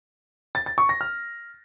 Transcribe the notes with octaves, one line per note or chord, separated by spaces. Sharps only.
A6
A6
C#6
A#6
F6